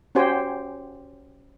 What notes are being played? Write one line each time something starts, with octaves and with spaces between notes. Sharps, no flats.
C#4 F#4 G4 C5 G5 G#5